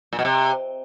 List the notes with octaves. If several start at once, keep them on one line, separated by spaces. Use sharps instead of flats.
A#2
B2
C3